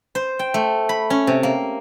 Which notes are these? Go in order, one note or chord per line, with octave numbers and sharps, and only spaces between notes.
C5
G5
A3
B5
C#4
C3
A#3